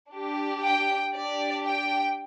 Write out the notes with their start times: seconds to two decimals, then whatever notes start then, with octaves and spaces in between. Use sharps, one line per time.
0.09 D4 G4
0.62 G5
1.14 D4 G4 D5
1.67 G5